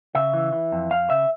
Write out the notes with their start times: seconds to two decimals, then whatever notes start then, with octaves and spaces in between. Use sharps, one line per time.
0.15 C#3 E5
0.34 E3
0.53 E3
0.72 F2
0.91 F2 F5
1.10 C#3 E5